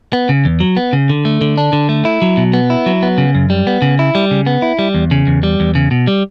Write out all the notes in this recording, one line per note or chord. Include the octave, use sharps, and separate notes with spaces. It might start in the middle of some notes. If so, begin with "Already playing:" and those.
B3
C#3
E2
F#3
B3
C#3
D3
A3
D3
D4
D3
A3
E4
F#3
B2
B3
E4
F#3
B3
C#3
F#2
G3
B3
C#3
E4
G3
C#3
B3
E4
G3
E2
C#3
E2
G3
E2
C#3
B2
G3